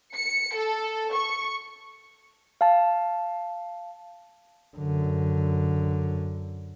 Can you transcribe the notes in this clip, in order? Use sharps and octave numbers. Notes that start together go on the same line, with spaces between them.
C#7
A4
C#6
F5 A5
F#2 D3